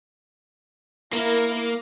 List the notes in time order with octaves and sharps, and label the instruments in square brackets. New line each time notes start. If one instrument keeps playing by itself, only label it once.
[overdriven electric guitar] A#3 [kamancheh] E4 A#4